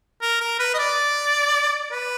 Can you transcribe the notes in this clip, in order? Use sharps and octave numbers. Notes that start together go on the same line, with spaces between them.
A#4
A#4
B4
D#5
D5
B4